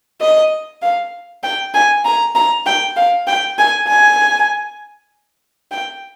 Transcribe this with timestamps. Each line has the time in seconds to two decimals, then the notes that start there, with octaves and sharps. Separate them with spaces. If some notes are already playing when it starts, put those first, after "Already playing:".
0.21 D#5
0.82 F5
1.44 G5
1.74 G#5
2.05 A#5
2.35 A#5
2.66 G5
2.97 F5
3.27 G5
3.58 G#5
3.88 G#5
5.72 G5